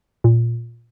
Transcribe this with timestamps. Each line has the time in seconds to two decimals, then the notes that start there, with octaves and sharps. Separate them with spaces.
0.24 A#2